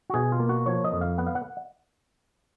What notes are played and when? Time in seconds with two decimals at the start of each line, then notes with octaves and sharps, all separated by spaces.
0.10 F#4
0.14 B2 G#4
0.32 F4
0.40 A#3
0.49 F#4
0.66 F3 C#5
0.84 D#5
0.92 F2
1.01 F5
1.18 B3 F#5
1.27 F5
1.35 F#5